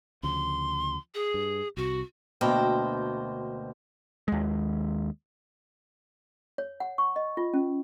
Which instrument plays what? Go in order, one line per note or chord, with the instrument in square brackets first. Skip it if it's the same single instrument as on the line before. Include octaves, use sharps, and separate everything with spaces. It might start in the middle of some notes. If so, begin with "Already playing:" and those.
[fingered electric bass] D2 C#3 F3 [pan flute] C6
[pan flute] G#4
[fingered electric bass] G2
[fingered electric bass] C2 C3 [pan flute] F#4
[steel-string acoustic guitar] D2 B2 A#3 C5 G5 A5
[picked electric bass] D#2 G#3
[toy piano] C#5
F#5
C#6
D#5
F4
C#4